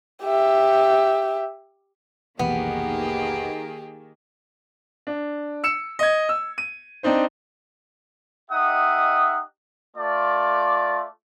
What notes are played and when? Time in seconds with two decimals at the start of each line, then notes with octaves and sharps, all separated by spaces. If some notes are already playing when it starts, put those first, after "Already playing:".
0.24 G4 E5
2.39 F1 B1 D#3 E3 A#3 B3 G4 G#4
5.07 D4
5.64 E6 C#7 E7
5.99 D#5 G#6
6.29 E6
6.58 D#7
7.03 C4 D4 D#4 C5
8.51 D#4 G4 D#5 E5 F#5 D#6
9.96 A3 F4 D5